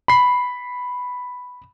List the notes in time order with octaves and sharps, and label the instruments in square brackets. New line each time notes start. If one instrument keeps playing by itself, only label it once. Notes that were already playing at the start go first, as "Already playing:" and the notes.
[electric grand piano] B5 C7